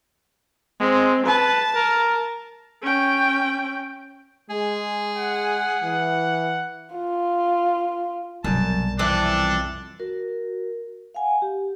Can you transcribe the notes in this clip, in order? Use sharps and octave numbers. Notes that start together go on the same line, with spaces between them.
G#3 C4
B4 A5
A#4
C#4 G5
G#3 G#4
F#5
E3
F4
B1 F#2 C3 G3 A5
F2 E3 D4 A4
F#4 A#4
F5 F#5 G#5
G4